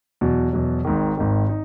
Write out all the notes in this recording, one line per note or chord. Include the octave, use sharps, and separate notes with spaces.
E2 B2 F#3
E2 B2 F#3
G#1 G#2 D#3
G#1 G#2 D#3
D#4